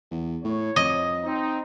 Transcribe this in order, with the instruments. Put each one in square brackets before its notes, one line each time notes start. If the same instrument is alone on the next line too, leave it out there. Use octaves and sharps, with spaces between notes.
[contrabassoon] E2
[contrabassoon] A2 [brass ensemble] C#5
[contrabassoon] F2 [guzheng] D#5
[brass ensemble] C4 D#4